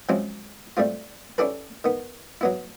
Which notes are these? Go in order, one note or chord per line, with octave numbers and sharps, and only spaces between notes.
F3 F#3 G#3 C4 C#4 E4
G3 A3 C4 F4
C#4 D4 E4 G4 A4 B4
D#3 B3
F#3 B3 E4